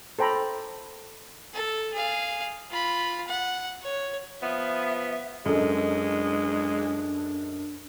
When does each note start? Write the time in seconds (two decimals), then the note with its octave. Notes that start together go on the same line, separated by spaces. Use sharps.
0.19 A4 C5 G5 A#5 B5
1.54 A4
1.93 G#4 F5
2.71 F4 B5
3.28 F#5
3.83 C#5
4.42 F3 B3 E5
5.46 F#2 G#3 D4 A4 D#5